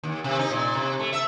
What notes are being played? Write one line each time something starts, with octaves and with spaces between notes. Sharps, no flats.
D#2
C3
D#4
A#2
C3
A3
E5